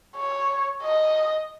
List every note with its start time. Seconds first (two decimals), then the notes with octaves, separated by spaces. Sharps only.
0.16 C#5
0.82 D#5